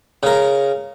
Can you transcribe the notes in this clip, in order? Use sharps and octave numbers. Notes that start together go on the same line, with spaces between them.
C#3 A#4